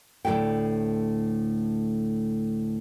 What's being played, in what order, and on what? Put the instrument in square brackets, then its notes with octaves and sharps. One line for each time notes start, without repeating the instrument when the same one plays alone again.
[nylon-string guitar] D2 A2 F#3 A4 G5